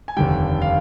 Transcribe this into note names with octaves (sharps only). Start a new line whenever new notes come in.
G#5
F1 D#2 D3 G3 G5
F5